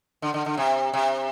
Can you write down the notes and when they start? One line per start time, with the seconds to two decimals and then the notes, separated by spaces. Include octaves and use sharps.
0.22 D3
0.34 D3
0.46 D3
0.57 C3
0.94 C3